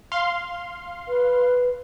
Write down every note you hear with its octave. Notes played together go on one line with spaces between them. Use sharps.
F5 C6
B4